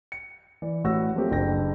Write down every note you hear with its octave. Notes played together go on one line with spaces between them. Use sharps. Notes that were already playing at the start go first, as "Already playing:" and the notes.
C#7
E3 D5
A1 A2 F#4 E6 A#6
F3 F#3 A3 A#3 C4 G4
F#1 D4 G5 A#6